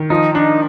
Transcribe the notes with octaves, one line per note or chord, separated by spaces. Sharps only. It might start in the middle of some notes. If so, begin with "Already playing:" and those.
Already playing: D#3
F3 D#4
D4 D#4